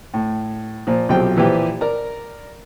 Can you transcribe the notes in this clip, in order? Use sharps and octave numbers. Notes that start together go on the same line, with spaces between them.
A2
A#2 F3
B1 C3 F3 F#3 G4 G5
A#2 E3 F3 E4 G4
A#4 D5 A#5